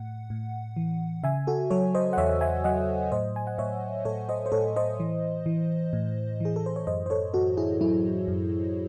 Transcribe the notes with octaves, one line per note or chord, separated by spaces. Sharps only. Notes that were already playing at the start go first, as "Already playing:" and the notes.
Already playing: A2 F#5
A2
E3
C#3 E5 G#5
F#4 A4
F#3 A4 C#5
C5 D#5
F#5
E2 C#5 E5
E5 G#5
F#3 D#5 F#5
A2 C5 D#5
G#5
F#5
A2 C#5 E5
A2 A4 C#5
C5 D#5
C5
A2 A4 C#5
C5 D#5
E3
E3
A2
E3 G#4
A4
C5
C#5
F#2 C5 D#5
C5
A4 C#5
F#2 F#4 A4
E4 G#4
F#3 E4
F#2